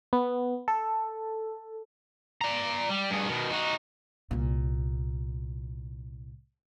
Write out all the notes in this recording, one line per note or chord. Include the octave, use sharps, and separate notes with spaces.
B3
A4
D5 A#5
G3
G2 G#4
B2 D#3
D#4 F#4
C2 A#2